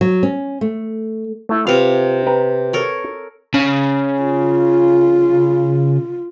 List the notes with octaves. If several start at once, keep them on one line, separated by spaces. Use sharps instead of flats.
F#3
C#4
A3
A3 E4
C3 F4 B4 F5
B4 G5 A#5
A4 A#4 C#5
C#3
F4